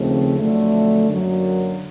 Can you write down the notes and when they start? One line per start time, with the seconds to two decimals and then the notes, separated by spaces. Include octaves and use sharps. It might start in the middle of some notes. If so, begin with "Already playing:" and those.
Already playing: D#2 C#3 F3 A3 C4
0.38 F2 D3 F#3 A3
1.08 F#2 D3 F#3 A#3